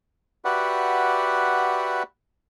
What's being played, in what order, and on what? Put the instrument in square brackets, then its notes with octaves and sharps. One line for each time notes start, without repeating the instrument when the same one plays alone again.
[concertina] F#4 G4 B4 D5 E5 F#5